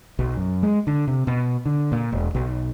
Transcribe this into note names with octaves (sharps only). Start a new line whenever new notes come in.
B1
F#2
G#3
D3
C3
B2
D3
A#2
E1
B1